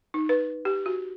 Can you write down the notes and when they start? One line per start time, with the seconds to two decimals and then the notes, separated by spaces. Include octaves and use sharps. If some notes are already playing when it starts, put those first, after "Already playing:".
0.14 D#4
0.29 B4
0.65 G4
0.86 F#4